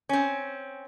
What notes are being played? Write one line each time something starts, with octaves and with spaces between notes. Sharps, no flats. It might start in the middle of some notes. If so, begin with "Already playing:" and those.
C4 C#4